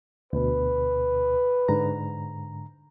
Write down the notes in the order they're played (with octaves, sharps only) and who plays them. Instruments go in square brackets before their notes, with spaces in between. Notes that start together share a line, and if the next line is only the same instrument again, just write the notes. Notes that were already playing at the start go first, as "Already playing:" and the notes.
[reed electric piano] D2 B2 [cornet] B4
[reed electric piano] G#2 D3 A#5